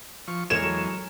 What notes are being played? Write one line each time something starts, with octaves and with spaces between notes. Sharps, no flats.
F3 C#6
E2 G#3 A#4 C#5 G#5 E7
F#3 A4 C#6